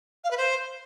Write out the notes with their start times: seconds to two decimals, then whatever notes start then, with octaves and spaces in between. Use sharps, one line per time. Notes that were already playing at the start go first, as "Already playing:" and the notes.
0.24 F5
0.31 B4
0.37 C5